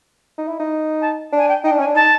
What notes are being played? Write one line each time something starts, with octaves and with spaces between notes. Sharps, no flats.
D#4
E4
D#4
A5
D4
G#5
G5
D#4 G5
D4
C#4 G#5
D4
D#4 A5